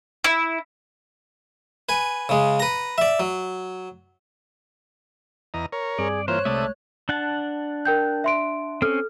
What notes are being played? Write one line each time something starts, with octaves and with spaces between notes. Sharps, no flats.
E4
B4 G#5
C#3 G#3
B4 A#5
D5 E5
F#3
E2 D#5 A#5
A#4 C#5
G2 G3 C4 G#4 D5
E3 A#3 F4 C5 C#5 F#6
C2 C3 G#3 A3 A4 D5 E5 D#6
D4 F#5 A5
A#4 G5 G6
E5 C6 D7
C4 C#4 A4 F6